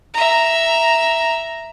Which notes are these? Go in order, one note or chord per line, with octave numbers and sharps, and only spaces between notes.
E5 A#5